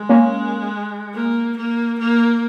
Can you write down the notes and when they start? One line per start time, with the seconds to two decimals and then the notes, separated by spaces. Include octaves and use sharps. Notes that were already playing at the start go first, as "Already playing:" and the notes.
Already playing: G#3
0.09 A#3 C#4
1.14 A#3
1.57 A#3
1.99 A#3